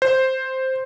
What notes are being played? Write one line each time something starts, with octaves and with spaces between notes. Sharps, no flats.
C5